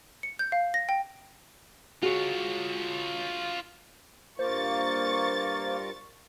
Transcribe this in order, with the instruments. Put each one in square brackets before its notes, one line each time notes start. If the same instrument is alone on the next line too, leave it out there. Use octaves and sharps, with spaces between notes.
[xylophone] C#7
G6
F5
A#6
G5
[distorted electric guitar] F4 C#5 [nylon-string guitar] F#4 G#4
[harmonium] G2 F4 A#4 [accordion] A#3 [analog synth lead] C5 [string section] C#6 A6